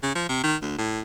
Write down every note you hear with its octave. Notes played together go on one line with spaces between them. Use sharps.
C#3
F3
C3
D#3
D2
A2